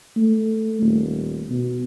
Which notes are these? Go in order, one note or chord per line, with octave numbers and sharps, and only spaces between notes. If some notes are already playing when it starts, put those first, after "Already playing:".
A3
D#1
B2